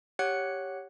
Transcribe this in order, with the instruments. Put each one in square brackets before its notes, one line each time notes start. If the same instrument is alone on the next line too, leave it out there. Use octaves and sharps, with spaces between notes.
[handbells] G4 C#5 F#5 F#6 C#7